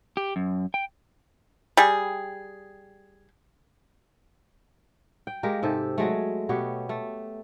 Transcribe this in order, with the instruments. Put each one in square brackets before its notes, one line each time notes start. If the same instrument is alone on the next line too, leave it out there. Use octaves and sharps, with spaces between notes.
[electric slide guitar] G4
F#2
G5
[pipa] G3 G#4
[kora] G5
G#3 A#3 G4 A#4
G#2 C3 G4 A4
F#3 G#3 A3
B2 B3 G4 C#5
A3